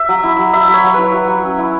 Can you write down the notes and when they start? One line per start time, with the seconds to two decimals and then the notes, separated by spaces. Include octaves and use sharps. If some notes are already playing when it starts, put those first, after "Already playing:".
Already playing: E5
0.09 F#3
0.23 E4
0.39 F#3
0.53 E4 E5
0.68 F#3
0.74 C#5
0.84 F#3
0.94 E4 B4
1.13 F#3
1.28 F#3
1.43 C#4
1.59 E4